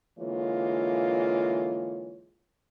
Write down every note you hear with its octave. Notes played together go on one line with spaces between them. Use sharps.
D3 E3 G#3 A#3 F4 C#5